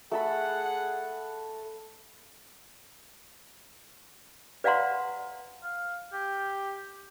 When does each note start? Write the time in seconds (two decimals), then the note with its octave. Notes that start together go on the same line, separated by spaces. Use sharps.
0.12 A3 G#4 A4 F#5 B5
4.64 B4 D5 F5 F#5 A#5 C6
5.63 F5
6.13 G4